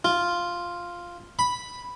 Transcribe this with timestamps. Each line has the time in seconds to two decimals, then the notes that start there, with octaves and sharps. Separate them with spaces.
0.05 F4
1.39 B5